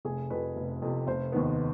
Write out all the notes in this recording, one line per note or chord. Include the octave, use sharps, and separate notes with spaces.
F1 G#4
F2 C3 B4
F1
F2 C3
F1 C5
D#2 D#3 B3